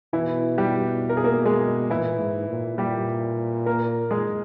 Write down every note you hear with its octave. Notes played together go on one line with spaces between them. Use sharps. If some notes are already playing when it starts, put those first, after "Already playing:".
B2 E3 E4
G3 G4
A#4
G#4
A#3 A#4
G#3 G#4
A#2 E3 E4
G#2
A#2
A#2 G3 G4
A#3 A#4
G#3 G#4